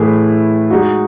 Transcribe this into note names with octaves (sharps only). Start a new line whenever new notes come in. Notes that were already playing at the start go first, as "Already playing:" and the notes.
Already playing: A2 E3 A3 E4 G#4
G#3 D#4 F#4